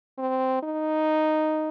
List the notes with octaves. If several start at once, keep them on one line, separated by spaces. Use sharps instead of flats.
C4
D#4